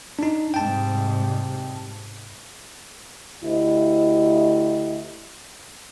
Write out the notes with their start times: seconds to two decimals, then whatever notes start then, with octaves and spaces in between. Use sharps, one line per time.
0.19 D4 D#4
0.54 G#2 C3 G3 G5 A5
3.43 D2 E4 G4 D#5